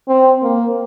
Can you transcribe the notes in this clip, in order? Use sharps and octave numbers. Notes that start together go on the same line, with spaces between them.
C4
A#3